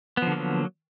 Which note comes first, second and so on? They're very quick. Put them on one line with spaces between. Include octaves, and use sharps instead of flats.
B3 F3 D3 A#3 F#3